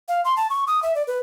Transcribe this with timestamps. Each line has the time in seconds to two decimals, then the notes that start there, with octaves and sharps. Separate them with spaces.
0.08 F5
0.25 C6
0.37 A5
0.50 C#6
0.67 D#6
0.83 E5
0.95 D5
1.07 B4